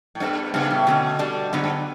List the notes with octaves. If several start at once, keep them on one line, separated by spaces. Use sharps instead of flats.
A2
G2 G3 B3 D4 A4
G2 C#3 G3 B3
A2
B2 D3 A3 C#4
G3 D4 A4
G2 D3 F#3 B3
G2